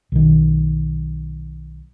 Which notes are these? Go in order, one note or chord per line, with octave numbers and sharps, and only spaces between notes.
B1 D#3